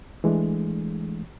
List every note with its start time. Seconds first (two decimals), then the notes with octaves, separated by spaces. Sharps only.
0.24 E3 G#3 A3 D4